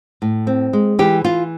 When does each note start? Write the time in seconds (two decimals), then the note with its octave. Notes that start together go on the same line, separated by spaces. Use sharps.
0.22 A2
0.47 C4
0.73 G#3
0.99 E3 G4
1.24 E3 F4